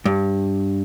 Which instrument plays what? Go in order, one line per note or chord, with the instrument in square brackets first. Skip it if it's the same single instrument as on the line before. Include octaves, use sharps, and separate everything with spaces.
[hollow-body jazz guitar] G2